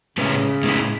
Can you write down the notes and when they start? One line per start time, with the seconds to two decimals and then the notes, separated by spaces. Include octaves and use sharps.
0.18 A2 C#3 G#3 B3 E4 B4
0.63 A2 G#3 B3 E4 B4